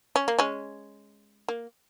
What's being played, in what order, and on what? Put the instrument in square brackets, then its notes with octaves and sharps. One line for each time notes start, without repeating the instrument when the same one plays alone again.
[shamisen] C#4
A#3
G#3 C#4
A#3